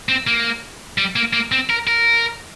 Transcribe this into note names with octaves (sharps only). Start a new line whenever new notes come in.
C4
A#3
G3
A#3
A#3
C4
A#4
A#4